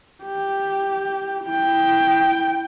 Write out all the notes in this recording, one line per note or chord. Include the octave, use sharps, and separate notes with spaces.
G4
E4 G5